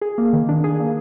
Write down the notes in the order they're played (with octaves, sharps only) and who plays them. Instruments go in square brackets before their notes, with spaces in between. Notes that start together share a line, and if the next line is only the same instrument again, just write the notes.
[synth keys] G#4
A#3
D#3
D4
G#4
A#3